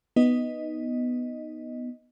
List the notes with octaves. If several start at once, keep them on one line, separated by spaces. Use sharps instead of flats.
B3 D#4 D#5